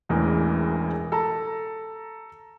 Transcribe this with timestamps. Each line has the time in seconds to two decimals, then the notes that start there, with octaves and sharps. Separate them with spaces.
0.09 E1 A1 E2 E3 A#4
1.12 A4 A5 A#5